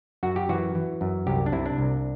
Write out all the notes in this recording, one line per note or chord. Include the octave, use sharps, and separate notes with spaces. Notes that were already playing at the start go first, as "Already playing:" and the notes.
F#2 F#4
G4
E3 F#4
E3
F#2
C2 G4
D4
C3 E4
D4
C2